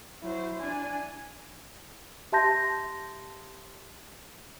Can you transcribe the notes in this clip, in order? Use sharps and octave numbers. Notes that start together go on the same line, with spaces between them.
F#3 E4 C5
D4 G#5
G4 E5 A5 C6 G6 A#6